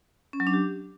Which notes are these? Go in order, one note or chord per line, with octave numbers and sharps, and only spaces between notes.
C#4
F#3
D4
G4